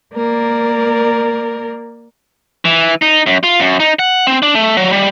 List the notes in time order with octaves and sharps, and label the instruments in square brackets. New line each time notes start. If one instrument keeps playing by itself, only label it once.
[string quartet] A#3 A#4 D5
[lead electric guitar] E3
D#4
F#2
F4
F#2
D#4
F#5
C4
D4
A3
F#3
G3